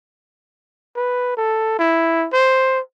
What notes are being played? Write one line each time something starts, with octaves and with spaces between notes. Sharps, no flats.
B4
A4
E4
C5